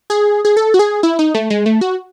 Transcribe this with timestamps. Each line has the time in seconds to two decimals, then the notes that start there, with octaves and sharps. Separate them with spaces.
0.10 G#4
0.45 G#4
0.57 A4
0.74 F#4
0.79 G#4
1.03 E4
1.19 D#4
1.34 A3
1.50 G#3
1.66 A3
1.81 F#4